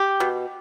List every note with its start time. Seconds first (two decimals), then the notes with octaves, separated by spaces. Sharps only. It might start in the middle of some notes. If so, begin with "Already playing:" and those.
Already playing: G4
0.20 B2